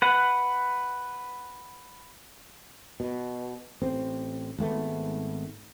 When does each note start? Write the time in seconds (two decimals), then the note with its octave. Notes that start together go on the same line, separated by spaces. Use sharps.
0.02 B4 F#5
3.00 B2
3.82 A1 C4
4.58 G#1 G#2 A3 B3